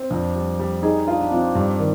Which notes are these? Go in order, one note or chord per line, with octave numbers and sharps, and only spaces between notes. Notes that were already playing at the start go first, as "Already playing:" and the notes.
Already playing: C4
F2 D4
G3
G3
D#4 G#4
D4 F4
D4
F3 C4
G2 G3
D#3